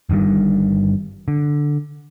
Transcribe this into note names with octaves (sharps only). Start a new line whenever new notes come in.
G1 G2 D#3 G3
D3